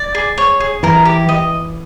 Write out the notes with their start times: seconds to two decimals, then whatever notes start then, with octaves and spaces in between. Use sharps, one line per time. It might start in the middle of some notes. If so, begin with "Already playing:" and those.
Already playing: D5
0.15 G#4
0.38 C#5
0.60 G#4
0.83 E3 A#4
1.05 G4
1.29 D#5